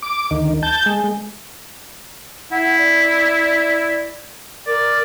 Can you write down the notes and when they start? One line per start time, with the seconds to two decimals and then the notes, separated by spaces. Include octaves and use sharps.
0.02 D6
0.31 D2 D#3
0.63 A5 G6
0.86 G#3
2.52 E4 F#5
2.78 D5
4.67 A#4 D5